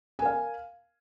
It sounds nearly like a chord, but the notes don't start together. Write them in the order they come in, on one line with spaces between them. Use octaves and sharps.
G#5 A#4 F5